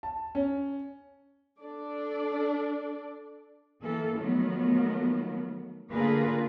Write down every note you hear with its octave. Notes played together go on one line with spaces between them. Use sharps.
A5
C#4
D4 A4 D5
E3 A#3 A4
D#3 F3 F#3 A3 B3
D3 A#3 F4 G#4 A#4 B4